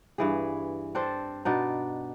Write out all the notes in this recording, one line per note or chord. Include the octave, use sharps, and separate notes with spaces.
G2 E3 G#4
C4 D4 A4 C5
B2 D4 D#4